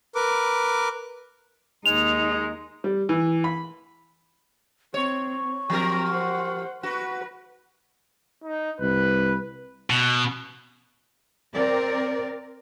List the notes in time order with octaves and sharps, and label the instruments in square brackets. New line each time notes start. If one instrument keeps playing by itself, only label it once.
[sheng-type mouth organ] A#4 B4 D6
[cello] D#2 D#4 [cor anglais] G#3 [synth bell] F7
[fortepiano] G3
E3
B5
[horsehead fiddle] C4 [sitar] C#5 [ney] C#6
[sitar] F3 G4 A#4 [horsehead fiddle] C4 A#5
[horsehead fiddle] C5 F#5
[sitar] F#4 [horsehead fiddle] B4
[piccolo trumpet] D#4
[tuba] C2 [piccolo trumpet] B4
[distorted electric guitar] B2
[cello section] C4 A#4 D5